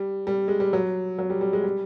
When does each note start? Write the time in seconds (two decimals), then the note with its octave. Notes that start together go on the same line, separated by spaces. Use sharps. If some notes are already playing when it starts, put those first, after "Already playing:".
Already playing: G3
0.27 G3
0.48 G#3
0.60 G3
0.73 F#3
1.18 F#3
1.30 G3
1.41 G3
1.53 G#3
1.64 G3